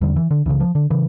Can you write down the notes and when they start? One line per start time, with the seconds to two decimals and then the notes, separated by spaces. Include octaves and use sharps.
0.01 E2 D3 G3
0.16 E3
0.31 D3
0.46 C#2 C#3 E3
0.60 F3
0.75 D3
0.90 C#3 E3